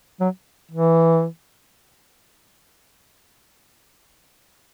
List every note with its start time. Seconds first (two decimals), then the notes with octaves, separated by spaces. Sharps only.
0.21 F#3
0.72 E3